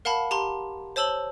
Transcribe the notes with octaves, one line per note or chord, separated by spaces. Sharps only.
A#4 F5 F#5 A5 B5
G4 A5 A#5 C6
C5 C#5 A5 E6 F#7 G7